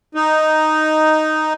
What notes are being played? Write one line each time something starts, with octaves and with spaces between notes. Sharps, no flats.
D#4